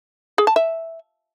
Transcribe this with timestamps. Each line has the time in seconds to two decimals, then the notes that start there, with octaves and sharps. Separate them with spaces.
0.38 G#4
0.47 A5
0.56 E5